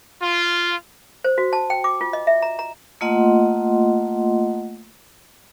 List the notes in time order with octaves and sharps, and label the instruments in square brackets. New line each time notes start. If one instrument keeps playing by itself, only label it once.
[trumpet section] F4
[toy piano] C5
F#4
A5
G5
D6
F4
D#5
E5
A#5
A#5
[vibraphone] A3 A#3 F4 D#5 F#5 C6